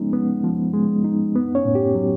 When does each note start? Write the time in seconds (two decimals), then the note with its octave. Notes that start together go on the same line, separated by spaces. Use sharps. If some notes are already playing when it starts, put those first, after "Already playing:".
Already playing: F3 G#3 B3 C#4 D#4
0.13 B3
0.44 F3
0.74 G#3
1.04 D#4
1.35 B3
1.55 C#4 C#5
1.65 A2
1.75 G4
1.95 F#3